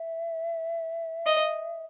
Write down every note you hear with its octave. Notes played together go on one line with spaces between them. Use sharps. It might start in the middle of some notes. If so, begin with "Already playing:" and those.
Already playing: E5
D#5